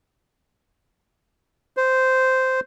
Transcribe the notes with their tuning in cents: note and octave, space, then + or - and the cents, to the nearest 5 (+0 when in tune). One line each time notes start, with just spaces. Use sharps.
C5 -10